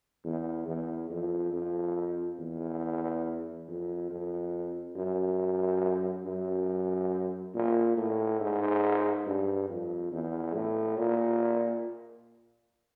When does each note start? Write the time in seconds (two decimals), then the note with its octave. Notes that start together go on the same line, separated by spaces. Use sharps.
0.25 E2
0.67 E2
1.10 F2
1.53 F2
2.39 E2
3.68 F2
4.11 F2
4.96 F#2
6.25 F#2
7.55 A#2
7.97 A2
8.41 G#2
9.27 G2
9.69 F2
10.12 E2
10.54 A2
10.97 A#2